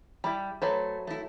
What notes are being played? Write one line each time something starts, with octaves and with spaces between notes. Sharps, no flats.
G3 E4 B5
F#3 A3 B4 C5
A3 E4